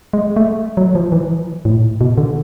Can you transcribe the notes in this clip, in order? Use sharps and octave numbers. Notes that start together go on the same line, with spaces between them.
G#3
A3
F#3
F3
E3
A2
B2
D3